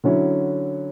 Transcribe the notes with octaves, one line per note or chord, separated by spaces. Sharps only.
D3 F#3 C#4 E4